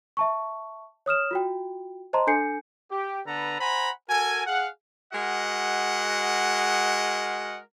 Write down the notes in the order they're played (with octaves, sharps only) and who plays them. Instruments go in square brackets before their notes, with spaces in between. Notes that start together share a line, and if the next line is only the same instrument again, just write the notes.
[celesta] E5 A5 C#6
C#5 D#6 F6 E7
F4 F#4 G5
C5 D#5 A5 A#5 C6
D4 A4 G#5 G6 C7 C#7
[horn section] G4
D3 B3 A4 B4 A#5
C5 F#5 G#5 A#5 B5
F#4 A4 A#4 G#5
G#4 F5 F#5
G#3 F#4 A#4 D#5 F#5